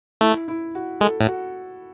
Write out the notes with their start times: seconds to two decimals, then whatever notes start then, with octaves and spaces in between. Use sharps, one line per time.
0.21 A3 E4
0.48 E4
0.75 F#4
1.00 G#3 A4
1.20 A2
1.27 F#4